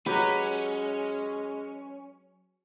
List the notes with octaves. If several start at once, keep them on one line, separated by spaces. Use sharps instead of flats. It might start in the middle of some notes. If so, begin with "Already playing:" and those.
F#3 G#3 C#4 G4 B4